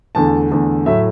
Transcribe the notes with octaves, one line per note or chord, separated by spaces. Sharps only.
E2 D3 A3 A5
E2 D3 A3
A2 F#3 A3 E5